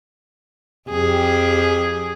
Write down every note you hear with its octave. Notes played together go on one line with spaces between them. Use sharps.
F2 G4 G#4